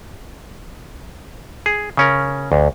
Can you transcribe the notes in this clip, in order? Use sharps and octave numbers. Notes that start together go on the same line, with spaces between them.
G#4
C#3 C#4 A#4
D2